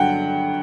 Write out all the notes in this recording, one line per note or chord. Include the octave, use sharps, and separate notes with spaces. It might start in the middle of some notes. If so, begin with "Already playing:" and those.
Already playing: G2 D3 F#3 F#5 G5